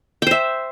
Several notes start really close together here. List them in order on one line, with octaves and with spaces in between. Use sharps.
G5 C5 E5